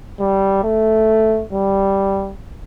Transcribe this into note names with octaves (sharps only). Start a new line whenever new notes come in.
G3
A3
G3